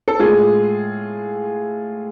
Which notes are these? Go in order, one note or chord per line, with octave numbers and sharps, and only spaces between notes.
A4
A2 G#3 F4 G#4